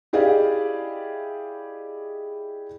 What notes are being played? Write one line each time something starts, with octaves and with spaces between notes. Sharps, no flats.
E4 G4 G#4 D5 D#5 F5